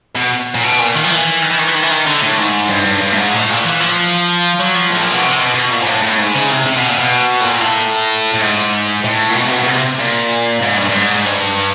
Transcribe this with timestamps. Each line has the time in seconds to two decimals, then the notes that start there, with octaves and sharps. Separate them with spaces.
0.15 B2
0.55 A#2
0.63 B2
0.79 A#2
0.95 D#3
1.04 F3
1.11 E3
1.42 D#3
1.51 E3
1.59 D#3
1.67 E3
1.75 D#3
1.83 E3
1.91 D#3
2.06 D3
2.22 A2
2.38 G#2
2.69 G2
2.85 G2
3.01 G2
3.12 A2
3.17 G#2
3.33 A2
3.49 A#2
3.64 E3
3.80 F3
4.60 F#3
4.75 F3
4.90 A2
5.01 A#2
5.12 B2
5.24 C3
5.39 B2
5.55 B2
5.71 A#2
5.82 G#2
5.87 A2
6.02 A2
6.19 G#2
6.35 C#3
6.50 C3
6.66 C3
6.77 B2
6.88 A#2
6.99 B2
7.41 A2
7.46 A#2
7.61 A2
8.34 A2
8.41 G#2
9.04 A2
9.30 A#2
9.36 B2
9.47 C3
9.52 B2
9.63 B2
9.67 C3
9.99 A#2
10.63 G#2
10.78 G2
10.90 G2
10.94 G#2
11.26 G2